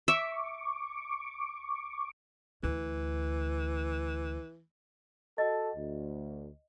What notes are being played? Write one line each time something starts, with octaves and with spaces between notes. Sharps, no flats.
E5 C#6 D6
D2 E3
F#4 A4 D#5
D2